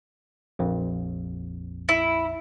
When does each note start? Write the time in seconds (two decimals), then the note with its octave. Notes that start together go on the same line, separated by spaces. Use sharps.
0.59 A#1 F2
1.89 E4